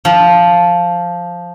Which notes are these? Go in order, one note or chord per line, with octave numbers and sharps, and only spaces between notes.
F3